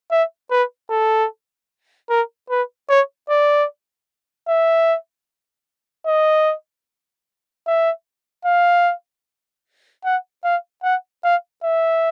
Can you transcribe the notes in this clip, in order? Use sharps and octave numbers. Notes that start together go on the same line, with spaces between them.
E5
B4
A4
A#4
B4
C#5
D5
E5
D#5
E5
F5
F#5
F5
F#5
F5
E5